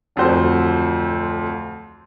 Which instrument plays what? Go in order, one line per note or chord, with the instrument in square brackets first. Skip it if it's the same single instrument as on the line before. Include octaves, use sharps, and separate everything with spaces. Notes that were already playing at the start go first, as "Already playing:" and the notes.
[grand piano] D1 F2 F#4 C5